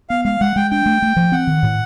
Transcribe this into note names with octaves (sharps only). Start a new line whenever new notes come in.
B3 F5
G#3 F5
G#3 F#5
G#3 G5
D4 G5
A3
A3
F3
C4 F#5
D#3
A2